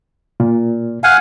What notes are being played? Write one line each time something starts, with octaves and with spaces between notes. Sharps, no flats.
A#2
F5 F#5 G#5